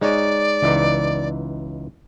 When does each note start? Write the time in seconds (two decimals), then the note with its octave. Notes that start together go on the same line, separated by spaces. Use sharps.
0.01 G#3 D#4 C#5 D5
0.62 C#2 E3 D#4